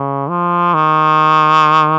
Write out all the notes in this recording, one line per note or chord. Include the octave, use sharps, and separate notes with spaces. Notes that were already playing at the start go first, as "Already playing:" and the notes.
Already playing: C#3
F3
D#3